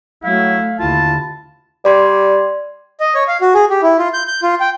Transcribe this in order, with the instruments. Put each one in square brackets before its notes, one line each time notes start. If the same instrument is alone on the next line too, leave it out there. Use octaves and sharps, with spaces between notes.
[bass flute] F#3 [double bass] A3 [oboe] E4 [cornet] F5
[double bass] D#2 D3 [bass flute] E4 [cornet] F4 [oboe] A5
[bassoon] G3 [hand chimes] D5 C6 G#6
[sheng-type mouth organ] D#5
C#5
F5
F#4
G#4
G4
E4
F4
G6
G6
F4
G5